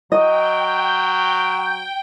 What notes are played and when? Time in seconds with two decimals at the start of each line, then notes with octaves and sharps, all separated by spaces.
0.12 F#3 D#5 G5